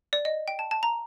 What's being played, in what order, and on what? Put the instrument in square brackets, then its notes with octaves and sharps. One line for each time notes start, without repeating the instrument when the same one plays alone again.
[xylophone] D5
D#5
G5
A5
A5
A#5